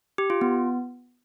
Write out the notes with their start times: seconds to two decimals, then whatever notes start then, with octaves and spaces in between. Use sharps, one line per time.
0.18 G4
0.30 F4
0.41 B3